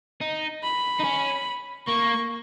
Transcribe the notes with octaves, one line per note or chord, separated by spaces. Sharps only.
D#4
B5
D#4
C#4
A#3 C#6